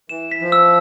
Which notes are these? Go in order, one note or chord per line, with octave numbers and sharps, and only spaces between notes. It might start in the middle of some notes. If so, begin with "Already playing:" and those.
E3 E7
B6
F3
E6